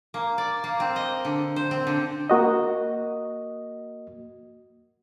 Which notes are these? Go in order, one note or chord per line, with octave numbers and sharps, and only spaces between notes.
A#3
D5
A#3
C4
D#5
D3
C5
C4
D3
A#3 F#4 D#5